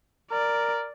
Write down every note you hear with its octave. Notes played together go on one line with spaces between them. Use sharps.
A#4 D5